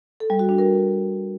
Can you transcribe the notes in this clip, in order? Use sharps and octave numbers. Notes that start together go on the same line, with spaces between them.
A4
G3
F#4
D4
A#4